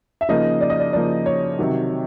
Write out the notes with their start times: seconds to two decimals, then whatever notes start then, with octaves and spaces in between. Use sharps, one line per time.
0.21 E5
0.29 C#3 F3 A#3 D#4 D#5
0.61 D5
0.70 D#5
0.79 D5
0.93 C#3 F3 A#3 D#4 D5
1.26 C#5
1.58 C3 D#3 F#3